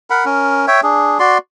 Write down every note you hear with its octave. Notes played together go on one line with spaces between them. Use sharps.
A#4 F#5 B5
C#4 A#4
C#5 E5 G5
D4 G#4
F#4 D5 C6